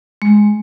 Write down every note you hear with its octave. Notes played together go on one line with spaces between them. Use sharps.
G#3